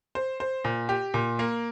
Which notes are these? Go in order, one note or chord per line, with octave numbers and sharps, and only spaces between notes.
C5
C5
A#2
G4
A#2
A#3